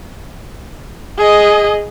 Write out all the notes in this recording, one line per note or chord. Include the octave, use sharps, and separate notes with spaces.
G#4 D#5